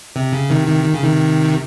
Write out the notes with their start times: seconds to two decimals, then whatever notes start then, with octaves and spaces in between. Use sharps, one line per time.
0.16 C3
0.33 C#3
0.50 C3 D#3
0.67 C3 D#3
0.84 D#3
0.94 C#3
1.03 C3 D#3